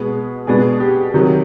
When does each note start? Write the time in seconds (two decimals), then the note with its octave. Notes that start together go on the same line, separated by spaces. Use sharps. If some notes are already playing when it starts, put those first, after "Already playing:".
Already playing: B2 G#3 B3
0.47 B2 G#3 B3 D4 G#4
0.80 G4
1.14 C3 D#3 F#3